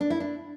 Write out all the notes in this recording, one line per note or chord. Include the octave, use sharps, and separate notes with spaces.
D4
E4
D4